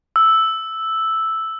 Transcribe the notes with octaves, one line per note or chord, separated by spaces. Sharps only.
E6